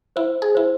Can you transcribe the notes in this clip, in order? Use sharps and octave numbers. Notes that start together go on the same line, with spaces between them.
E4 C5
G#4
E4 C5